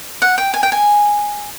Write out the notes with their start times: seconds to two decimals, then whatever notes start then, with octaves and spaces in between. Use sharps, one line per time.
0.22 F#5
0.38 G5
0.54 G#5
0.63 G5
0.72 G#5